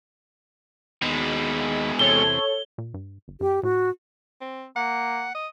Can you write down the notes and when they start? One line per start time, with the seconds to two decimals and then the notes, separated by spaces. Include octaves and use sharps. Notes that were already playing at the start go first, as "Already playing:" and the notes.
1.02 D#2 B2 G#3 B5
1.99 E2 C3 A4 C#5 G7
2.78 A#2
2.94 G2
3.28 G1
3.41 F#2 G4
3.63 A2 F#4
4.41 C4
4.76 A#3 F#5
5.35 D#5